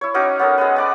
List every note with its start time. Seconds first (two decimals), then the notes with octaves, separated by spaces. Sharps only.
0.01 E4 C#5
0.14 C#4 D#4 F#4 D6
0.39 B3 C#4 A4 A#4
0.58 G#3 B3 B4
0.76 B3 D5 D6